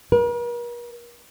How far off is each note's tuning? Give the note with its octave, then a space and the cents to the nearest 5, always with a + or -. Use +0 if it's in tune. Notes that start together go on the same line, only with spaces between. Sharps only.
A#4 +45